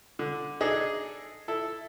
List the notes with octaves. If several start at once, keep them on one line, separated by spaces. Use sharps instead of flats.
D3
D4 D#4 G#4 A4 D#5
E4 A4